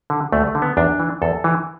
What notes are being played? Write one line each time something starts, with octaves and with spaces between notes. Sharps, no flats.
D3
D2 A3
A3
D3
B3
E2 D4
E3
E2 A4
E3